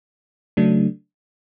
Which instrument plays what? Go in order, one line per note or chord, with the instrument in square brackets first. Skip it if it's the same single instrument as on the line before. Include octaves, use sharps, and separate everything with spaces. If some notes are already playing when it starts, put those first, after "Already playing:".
[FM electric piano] C#3 F#3 A3 D4